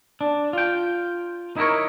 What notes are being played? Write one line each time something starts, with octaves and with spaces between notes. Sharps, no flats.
D4
F4 G5
D#4 E4 F#4 A#4 C#5